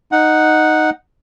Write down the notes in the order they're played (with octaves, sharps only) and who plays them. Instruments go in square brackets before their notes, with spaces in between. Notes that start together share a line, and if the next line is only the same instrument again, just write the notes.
[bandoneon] D#4 F#5